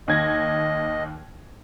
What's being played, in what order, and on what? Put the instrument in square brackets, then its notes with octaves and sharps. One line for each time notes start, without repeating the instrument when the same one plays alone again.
[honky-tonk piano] D#2 G#6 A#6 [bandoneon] D#5